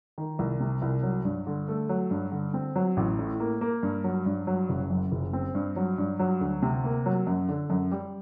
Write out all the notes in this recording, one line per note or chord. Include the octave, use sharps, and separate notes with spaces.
D#3
C2
C3
C2
F#3
G2
D3
A3
F#3
G2
D3
C4
F#3
A1
A2
A#3
A#3
G2
F#3
G2
F#3
F#1
F#2
F#1
C4
G2
F#3
G2
F#3
D2
C3
A#3
F#3
F#2
D3
F#2
G3